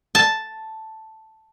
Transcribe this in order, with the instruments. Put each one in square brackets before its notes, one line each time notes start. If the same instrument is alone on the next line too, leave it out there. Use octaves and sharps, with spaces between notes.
[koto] A5